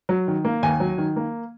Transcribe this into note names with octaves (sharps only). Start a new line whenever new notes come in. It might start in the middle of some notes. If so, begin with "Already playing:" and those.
F#3
D#3
A#3
D#2 G#5
F#3
D#3
A#3